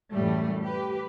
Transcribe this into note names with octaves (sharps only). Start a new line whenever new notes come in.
F#2 A2 E3 G3 A3
G4 B4